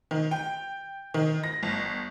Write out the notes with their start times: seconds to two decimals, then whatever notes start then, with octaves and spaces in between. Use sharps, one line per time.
0.11 D#3
0.31 G5
1.14 D#3
1.44 A#6
1.63 G1